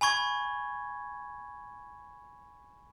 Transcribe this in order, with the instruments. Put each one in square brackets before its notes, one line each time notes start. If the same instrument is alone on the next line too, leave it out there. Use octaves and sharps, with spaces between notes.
[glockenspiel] G#5 B5 C#6 G#6